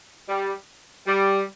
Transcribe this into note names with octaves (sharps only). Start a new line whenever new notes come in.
G3
G3